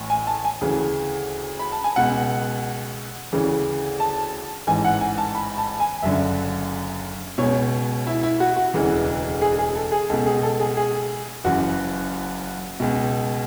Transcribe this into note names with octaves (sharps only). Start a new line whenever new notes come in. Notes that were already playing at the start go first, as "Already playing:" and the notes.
Already playing: A1 A2
G#5
A5
G#5
D2 C#3 E3
B5
A5
G#5
C#2 B2 F#5
D2 C#3 E3
A5
A1 G#2 E3 G#5
F#5
G#5
A5
B5
A5
G#5
F#1 F#2 D3 E5
C#2 B2 C#5
E4
E4
F#4
F#4
E1 D2 C#3 E3
G#4
G#4
A4
G#4
C#2 B2 A4
G#4
A4
G#4
G#4
F#1 F#2 E3 F#4
C#2 B2